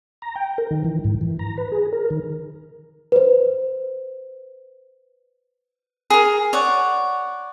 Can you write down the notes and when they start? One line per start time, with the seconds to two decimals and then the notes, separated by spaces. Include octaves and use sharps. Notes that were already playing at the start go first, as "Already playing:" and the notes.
0.22 A#5
0.36 G5
0.58 A#4
0.71 D#3
0.84 E3
1.04 G#2
1.21 E3
1.39 A#5
1.58 B4
1.72 G#4
1.93 A#4
2.10 D#3
3.12 B4 C5
6.10 G#4 A#4
6.53 C#5 D5 F#5